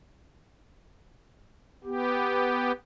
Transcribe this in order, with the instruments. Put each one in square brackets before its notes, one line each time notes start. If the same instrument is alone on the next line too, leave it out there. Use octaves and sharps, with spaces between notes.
[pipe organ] B3 G4